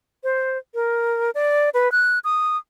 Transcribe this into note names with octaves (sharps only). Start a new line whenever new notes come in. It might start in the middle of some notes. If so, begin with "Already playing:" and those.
C5
A#4
D5
B4
F#6
D#6